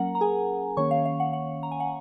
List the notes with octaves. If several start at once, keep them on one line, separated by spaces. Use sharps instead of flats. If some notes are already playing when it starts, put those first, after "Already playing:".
Already playing: F#3 A#3 C#4 A#4 F#5 A#5
A#5
G#4 G#5
D#3 A#3 C#4 C#5 C#6
F5
F5
F#5
F#5
A#5
G#5
F#5